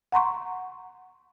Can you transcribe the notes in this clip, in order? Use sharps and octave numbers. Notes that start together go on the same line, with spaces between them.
F#5 A#5 C6 C#6